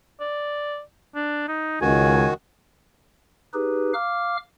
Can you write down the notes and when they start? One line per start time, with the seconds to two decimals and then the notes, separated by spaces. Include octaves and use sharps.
0.20 D5
1.15 D4
1.48 D#4
1.81 C#2 D#3 F#4 G#5
3.54 D#4 G4 G#4 B4
3.94 F5 D6 F6